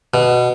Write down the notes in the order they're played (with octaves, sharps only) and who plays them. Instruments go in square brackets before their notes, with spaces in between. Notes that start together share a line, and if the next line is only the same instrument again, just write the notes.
[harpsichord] B2